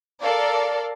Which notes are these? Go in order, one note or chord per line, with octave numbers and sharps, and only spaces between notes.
A4 A#4 D5 F5